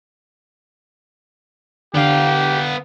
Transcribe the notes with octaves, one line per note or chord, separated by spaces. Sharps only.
D3 B3 G4 F5